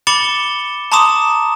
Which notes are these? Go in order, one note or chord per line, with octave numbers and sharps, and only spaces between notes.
B5 D6 A6 C#7 E7 G7
A5 A#5 C6 D6 D#6 E7